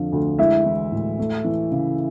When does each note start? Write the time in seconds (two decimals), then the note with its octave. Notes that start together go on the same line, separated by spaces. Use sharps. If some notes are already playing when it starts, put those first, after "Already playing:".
Already playing: F2 D3 F3
0.12 D2
0.39 G#3 E4 E5
0.65 E3
0.92 A2
1.18 A3
1.44 E3
1.71 C#3